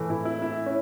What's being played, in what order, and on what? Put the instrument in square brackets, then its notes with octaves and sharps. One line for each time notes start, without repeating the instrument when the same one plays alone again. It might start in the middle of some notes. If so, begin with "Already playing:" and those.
Already playing: [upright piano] A2 E3 A3
E4
E4
E4
C#4